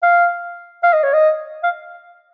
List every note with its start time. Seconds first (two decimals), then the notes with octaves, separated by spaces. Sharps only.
0.03 F5
0.83 F5
0.93 D#5
1.03 C#5
1.14 D#5
1.63 F5